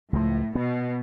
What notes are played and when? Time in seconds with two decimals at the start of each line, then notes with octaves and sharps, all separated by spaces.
0.13 C#2 A2 F3
0.55 B2 B3